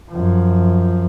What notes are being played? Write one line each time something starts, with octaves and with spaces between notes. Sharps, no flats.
F#2 F3